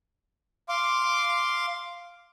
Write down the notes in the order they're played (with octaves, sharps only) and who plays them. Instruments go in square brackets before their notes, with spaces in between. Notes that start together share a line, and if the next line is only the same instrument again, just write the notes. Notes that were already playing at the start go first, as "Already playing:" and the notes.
[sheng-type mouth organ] F5 C6 D6